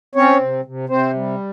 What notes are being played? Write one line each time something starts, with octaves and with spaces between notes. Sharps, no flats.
C4 C#4 C#5
C3
C3
C3 C4 C5
G3